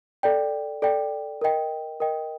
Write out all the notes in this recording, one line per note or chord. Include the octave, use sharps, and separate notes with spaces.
A4 D5 G5
A4 D5 G5
A#4 D#5 G5
A#4 D#5 G5